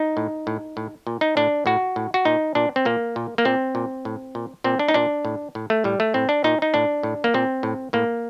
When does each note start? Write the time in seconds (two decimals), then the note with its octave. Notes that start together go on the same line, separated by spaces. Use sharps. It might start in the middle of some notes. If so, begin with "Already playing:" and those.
Already playing: D#4
0.17 A2
0.47 A2
0.77 A2
1.07 A#2
1.21 D#4
1.37 A2 D4
1.66 A2 F#4
1.96 A2
2.14 F#4
2.25 A#2 D#4
2.55 A#2 D4
2.76 C4
2.85 A#2 A#3
3.16 A#2
3.38 A#3
3.45 A#2 C4
3.75 A#2
4.05 A2
4.35 A#2
4.64 A#2 C4
4.79 D4
4.88 D#4
4.94 A#2 D4
5.25 A2
5.55 A2
5.70 A3
5.84 A2 G3
6.00 A3
6.14 A2 C4
6.29 D4
6.44 A#2 D#4
6.62 D#4
6.74 A2 D4
7.03 A2
7.24 A#3
7.34 A#2 C4
7.63 A2
7.93 A2 A#3